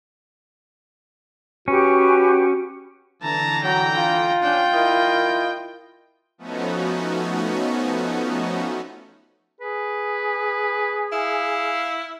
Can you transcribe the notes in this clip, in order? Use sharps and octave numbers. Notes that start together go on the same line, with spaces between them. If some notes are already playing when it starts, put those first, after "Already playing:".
C#4 F#4 G4 B4 C#6
D3 E3 A5 A#5
F#3 G5 A#5
F4
C#4 D4 G5
E4 A#4 D#5
F3 A3 B3 C#4 D#4 F#4
G#4 B4
E4 F5